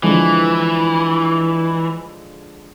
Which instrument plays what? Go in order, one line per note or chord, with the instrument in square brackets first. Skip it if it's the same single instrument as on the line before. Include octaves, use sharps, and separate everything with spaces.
[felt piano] D3 F3 G#3 [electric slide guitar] E3